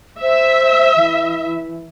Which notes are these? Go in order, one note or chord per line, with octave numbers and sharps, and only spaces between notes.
C5 E5
E3